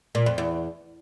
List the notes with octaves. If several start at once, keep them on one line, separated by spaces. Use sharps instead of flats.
A#2
F2
E2